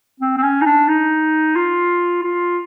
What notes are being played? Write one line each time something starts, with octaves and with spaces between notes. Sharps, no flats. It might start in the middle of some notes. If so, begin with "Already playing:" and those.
C4
C4
C#4
D#4
D4
D#4
F4
F4